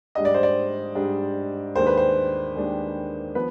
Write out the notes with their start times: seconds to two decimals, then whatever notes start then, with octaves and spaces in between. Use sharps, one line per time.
0.15 G#2 G3 D4 D#5
0.25 D5
0.34 C5
0.43 D5
0.95 G#2 G3 D4
1.75 D#2 D#3 G#3 D4 C5
1.87 B4
1.97 C5
2.55 D#2 D#3 G#3 D4
3.35 F3 B3 B4